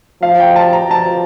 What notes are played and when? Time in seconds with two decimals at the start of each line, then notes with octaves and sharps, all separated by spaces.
0.22 F3 F5
0.40 G5
0.56 A5
0.73 A#5
0.90 F3 A5